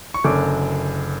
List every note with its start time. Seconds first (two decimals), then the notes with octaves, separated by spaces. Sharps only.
0.14 C#6
0.24 F#1 F#2 D3 D6